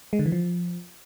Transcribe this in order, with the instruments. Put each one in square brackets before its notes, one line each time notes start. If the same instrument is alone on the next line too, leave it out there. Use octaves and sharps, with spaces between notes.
[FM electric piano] G#3
D3
E3
F3